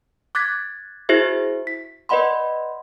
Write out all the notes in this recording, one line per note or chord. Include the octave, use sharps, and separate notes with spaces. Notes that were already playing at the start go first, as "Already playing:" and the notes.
D6 F#6 G#6 A6 B6
E4 F#4 G#4 C5 E5
B6
B4 D5 D#5 F#5 B5 C6